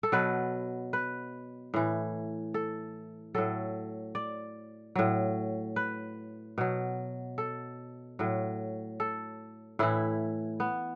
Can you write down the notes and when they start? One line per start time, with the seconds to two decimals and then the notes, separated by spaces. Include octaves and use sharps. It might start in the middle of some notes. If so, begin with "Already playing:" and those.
0.03 A4
0.12 B2 F#3 B4
0.93 B4
1.74 A2 E3
2.54 A4
3.35 A2 F#3 A4
4.15 D5
4.95 A2 F#3
5.76 B4
6.58 B2 F#3
7.38 A4
8.19 A2 F#3
9.00 A4
9.79 A2 E3 E4
10.60 B3